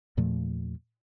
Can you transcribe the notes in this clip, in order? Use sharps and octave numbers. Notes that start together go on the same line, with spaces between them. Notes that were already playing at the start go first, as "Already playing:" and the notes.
E2 A#2 F3 A3